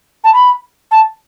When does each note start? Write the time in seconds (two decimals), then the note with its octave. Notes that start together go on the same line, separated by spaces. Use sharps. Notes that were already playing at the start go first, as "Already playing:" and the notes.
0.24 A5
0.33 B5
0.91 A5